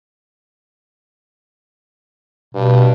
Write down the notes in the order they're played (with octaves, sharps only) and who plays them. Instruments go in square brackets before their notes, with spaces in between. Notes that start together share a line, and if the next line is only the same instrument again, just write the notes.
[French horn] G2 [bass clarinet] B2